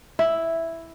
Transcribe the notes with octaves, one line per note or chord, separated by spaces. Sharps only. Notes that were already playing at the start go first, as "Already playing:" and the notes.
E4